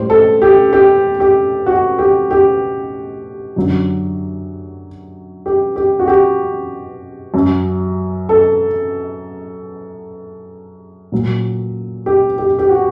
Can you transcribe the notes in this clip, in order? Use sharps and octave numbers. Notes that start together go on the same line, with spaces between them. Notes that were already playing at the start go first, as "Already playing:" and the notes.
Already playing: A2 G3 C5
A4
G4
G4
G4
F#4
G4
G4
F#2 D3 F#3
G4
G4
F#4
G4
F#2 F#3
A4
A#2 F#3
G4
G4
G4
F#4